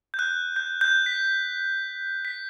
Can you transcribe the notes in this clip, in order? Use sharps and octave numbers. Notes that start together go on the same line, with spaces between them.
G6
F#6
G6
G6
B6
B6